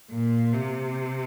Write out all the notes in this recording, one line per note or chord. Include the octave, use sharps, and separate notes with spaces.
A#2
C3